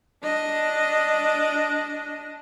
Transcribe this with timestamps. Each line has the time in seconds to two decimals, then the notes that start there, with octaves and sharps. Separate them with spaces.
0.23 D4 D#5